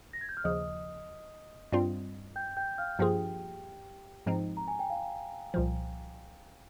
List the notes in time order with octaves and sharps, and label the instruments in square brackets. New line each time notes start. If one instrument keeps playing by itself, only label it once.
[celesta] A#6
G#6
G6
F6
[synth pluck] D#2 C#3 F3 [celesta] D#5 D#6
[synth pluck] G2 G3 C4 F4
[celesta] G5 G6
G5 G6
F5 F6
[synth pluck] G2 F3 A#3 F4 G#4 [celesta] G4 G5
[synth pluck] G#2 F3 G#3 C4 D#4
[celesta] A#5
G#5
G5
F5
[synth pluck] C2 A#2 F3